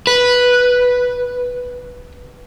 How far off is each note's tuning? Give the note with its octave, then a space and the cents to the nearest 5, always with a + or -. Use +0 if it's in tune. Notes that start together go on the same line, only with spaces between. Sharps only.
B4 -5